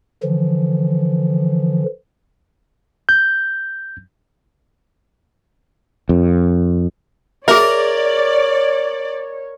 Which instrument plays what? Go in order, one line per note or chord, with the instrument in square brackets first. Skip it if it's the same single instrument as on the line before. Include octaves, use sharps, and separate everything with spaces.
[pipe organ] D3 E3 F3
[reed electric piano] G6
[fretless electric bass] F2
[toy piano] G#4 E5 [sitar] A#4 [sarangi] C#5 [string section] D5